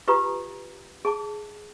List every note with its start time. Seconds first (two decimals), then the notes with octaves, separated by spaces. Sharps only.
0.08 F4 G4 B4 A#5 B5 D#6
1.05 G#4 A5 D6